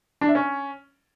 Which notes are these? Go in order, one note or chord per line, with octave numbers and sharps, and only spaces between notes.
D4
E5
C#4